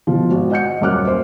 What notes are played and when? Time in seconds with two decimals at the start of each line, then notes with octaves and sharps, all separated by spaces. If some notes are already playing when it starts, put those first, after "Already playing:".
0.07 B2 F3
0.30 G#1 F#4
0.51 D#5 F#5 G6 C#7
0.81 D#1 F#2 A#3 D6 F6 F#6
1.07 C5